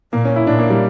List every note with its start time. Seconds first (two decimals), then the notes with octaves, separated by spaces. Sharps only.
0.13 A#2 A#3
0.25 C#4
0.36 E4
0.47 A#2 D4
0.59 A#3
0.70 G3